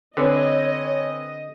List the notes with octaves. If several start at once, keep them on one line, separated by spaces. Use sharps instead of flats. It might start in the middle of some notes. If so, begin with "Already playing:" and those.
D3 C4 B4 C#5 D#5 G#5